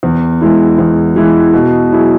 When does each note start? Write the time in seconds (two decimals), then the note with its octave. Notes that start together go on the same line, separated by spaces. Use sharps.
0.03 E2
0.41 E3 G#3 E4
0.78 E2
1.16 E3 G#3 E4
1.53 B2
1.91 F#3 E4 G#4